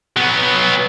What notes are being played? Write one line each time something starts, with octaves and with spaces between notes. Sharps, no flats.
F#3 B3